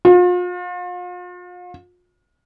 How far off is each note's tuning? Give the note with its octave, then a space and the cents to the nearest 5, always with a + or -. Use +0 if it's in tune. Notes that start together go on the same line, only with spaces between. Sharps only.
F4 +40